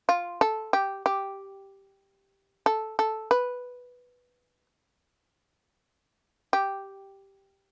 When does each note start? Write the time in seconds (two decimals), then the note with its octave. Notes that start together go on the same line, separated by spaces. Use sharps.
0.09 F4
0.41 A4
0.73 G4
1.06 G4
2.66 A4
2.99 A4
3.31 B4
6.53 G4